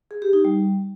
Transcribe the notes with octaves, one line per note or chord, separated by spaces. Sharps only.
G#4
G4
D#4
G3